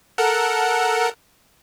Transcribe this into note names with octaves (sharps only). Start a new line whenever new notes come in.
A4 A#4 F#5